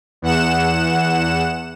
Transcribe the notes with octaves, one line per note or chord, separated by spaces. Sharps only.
E2 F#5 E7